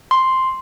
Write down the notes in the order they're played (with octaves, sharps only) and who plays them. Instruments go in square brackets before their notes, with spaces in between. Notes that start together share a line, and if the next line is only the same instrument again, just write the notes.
[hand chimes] C6